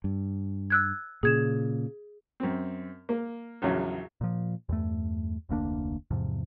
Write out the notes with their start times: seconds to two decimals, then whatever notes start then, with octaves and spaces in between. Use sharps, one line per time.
0.04 G2
0.70 E6 F#6 G#6
1.23 A#2 C#3 G#4 G#6 E7
2.40 F#2 C4
3.09 A#3
3.62 A#1 E2 C#3 F#3
4.21 A#2 F3
4.69 E2 G2 A3
5.49 F1 D2 A#3 D4
6.11 E2 G#2 C3 F3